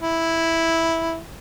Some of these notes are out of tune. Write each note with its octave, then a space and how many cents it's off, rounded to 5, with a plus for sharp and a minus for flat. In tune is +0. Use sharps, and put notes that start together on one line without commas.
E4 -5